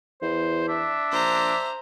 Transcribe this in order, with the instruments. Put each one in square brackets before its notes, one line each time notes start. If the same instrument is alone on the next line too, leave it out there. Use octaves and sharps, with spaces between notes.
[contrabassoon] E2 [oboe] C5
[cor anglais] D4 [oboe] E5
[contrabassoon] A#1 [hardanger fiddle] C5 A#5